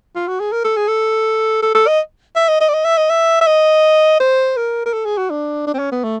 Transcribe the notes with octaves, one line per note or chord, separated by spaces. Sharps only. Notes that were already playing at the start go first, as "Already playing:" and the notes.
F4
F#4
G#4
A#4
A4
G#4
A4
A4
A4
D#5
E5
D#5
D#5
D5
D#5
E5
D#5
E5
E5
D#5
C5
A#4
A#4
A4
G#4
F#4
D4
D4
C4
C#4
B3
A3